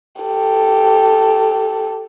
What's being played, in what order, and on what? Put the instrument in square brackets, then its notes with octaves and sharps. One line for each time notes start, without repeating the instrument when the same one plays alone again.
[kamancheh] G4 A4